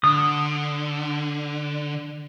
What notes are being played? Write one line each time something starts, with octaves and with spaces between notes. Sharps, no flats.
D3 D#6